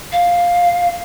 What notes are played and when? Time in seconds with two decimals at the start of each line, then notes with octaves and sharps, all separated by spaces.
0.12 F5